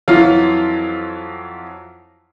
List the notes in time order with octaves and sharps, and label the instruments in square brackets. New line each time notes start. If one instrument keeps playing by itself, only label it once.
[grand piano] F2 E3 F#3 F4 F5 F6